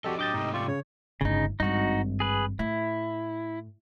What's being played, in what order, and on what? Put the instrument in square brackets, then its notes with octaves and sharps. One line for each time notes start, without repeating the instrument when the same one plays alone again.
[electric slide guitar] F3 C4 D#5 [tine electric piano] F#4 G4 A4 [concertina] D5
[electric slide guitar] F#3 D4 [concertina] G4 D#5 [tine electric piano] D6 G6 A6
[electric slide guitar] G#2 C3 A3 [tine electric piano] D#4
[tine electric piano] F4 [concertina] G4 D5 C#6
[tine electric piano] C#3 [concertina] C#5
[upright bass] G1 A2 [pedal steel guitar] C#3 D#4
[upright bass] G#1 G2 [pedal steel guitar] D#4 F#4
[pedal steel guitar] G#4 B4
[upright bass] A2 [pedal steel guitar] E4